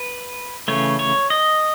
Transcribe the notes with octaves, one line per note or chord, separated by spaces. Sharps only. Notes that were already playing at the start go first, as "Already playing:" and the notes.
Already playing: B4
C#3 E3 A3 C#5
C#5
D#5